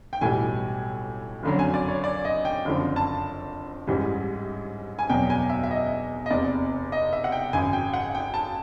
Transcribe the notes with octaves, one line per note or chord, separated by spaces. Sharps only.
G5
B1 A2 E3 G3 G#5
F#1 F2 D3 F#3
G#5
D5
C#5
D5
D#5
G5
F#1 F2 D3 F3
A5
A1 G#2 E3 G3
G#5
E2 B2 F#3 G5
G#5
E5
E5
D#5
D#5
F1 E2 C3 D5
D#5
E5
F#5
G5
G#1 F#2 C#3 G#5
G5
F#5
G5
A5